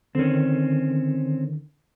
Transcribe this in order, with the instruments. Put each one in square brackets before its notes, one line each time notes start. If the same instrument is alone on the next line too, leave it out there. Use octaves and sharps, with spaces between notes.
[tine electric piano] D3 D#3 [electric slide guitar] C4 C#4